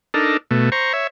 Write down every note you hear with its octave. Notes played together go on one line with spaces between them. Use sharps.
D4 D#4 A4 A#4
B2 A3
C5 A#5 C#6
C#5 E5